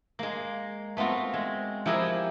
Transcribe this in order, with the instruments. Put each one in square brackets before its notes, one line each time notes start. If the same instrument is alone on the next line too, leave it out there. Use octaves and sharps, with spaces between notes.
[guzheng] G#3 A#3
A3 B3 C4 F4 F#4
G#3
F3 E4 G4 G#4 A#4